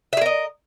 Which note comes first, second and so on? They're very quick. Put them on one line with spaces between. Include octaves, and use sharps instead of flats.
E5 G#4 A#4 D#5